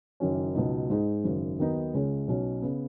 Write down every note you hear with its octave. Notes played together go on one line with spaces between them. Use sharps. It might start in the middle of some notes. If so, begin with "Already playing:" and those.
F#1 F#2 D#3 F#3 C#4
C#2 B2 F#3 B3 D#4
G#2 G#3 D#4
G#1 F#2 C#3 F#3
D#2 D#3 F#3 B3 D#4
C#2 C#3 G#3 C#4
B1 B2 F#3 C#4
C#3 B3